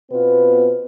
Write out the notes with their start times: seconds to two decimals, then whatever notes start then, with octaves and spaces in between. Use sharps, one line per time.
0.11 B2 B3 C4 F4 B4